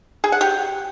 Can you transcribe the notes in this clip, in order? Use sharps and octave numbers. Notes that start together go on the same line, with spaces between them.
G#4
F#5
G4